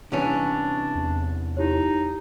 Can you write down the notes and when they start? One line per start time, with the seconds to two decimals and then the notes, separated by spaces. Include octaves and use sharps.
0.12 C2 E3 C#4 D4
0.95 E2
1.57 D#4 E4 G4 C#5